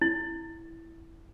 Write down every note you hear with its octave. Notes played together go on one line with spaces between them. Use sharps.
E4